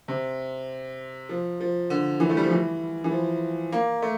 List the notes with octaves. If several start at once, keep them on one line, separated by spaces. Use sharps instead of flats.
C3
F3
F3
D3
E3
A3
G3
F3
E3
E3
F3
A#3
A3